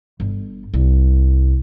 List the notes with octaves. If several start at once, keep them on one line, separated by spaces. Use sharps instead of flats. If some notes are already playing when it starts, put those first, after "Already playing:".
G1
C2